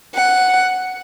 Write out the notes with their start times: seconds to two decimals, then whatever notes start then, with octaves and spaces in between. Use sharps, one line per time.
0.16 F#5